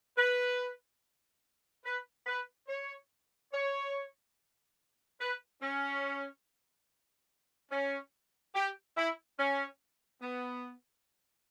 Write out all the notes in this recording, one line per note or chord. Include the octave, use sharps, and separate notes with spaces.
B4
B4
B4
C#5
C#5
B4
C#4
C#4
G4
E4
C#4
B3